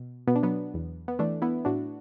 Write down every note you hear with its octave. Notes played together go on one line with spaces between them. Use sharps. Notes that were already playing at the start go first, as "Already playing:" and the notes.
Already playing: B2
B2 B3
D4
F#3 B3
E2
B3
E3 A3 D4
B3 E4
A2 D4 F#4